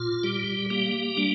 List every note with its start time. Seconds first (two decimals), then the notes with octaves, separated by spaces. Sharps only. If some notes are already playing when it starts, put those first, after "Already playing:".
Already playing: A#2 F4
0.23 G3 G4
0.70 A#3 G4
1.17 G3 D4